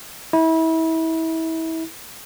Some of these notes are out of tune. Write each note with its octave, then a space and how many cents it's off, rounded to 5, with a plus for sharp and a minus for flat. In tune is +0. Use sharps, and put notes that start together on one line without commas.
E4 -30